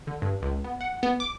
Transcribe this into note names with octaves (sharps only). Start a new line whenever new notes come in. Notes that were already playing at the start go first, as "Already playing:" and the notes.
D3
G2
C#2
B3
F#5
B3
D6